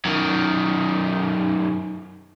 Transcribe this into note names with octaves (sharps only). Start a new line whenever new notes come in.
F#2 D#3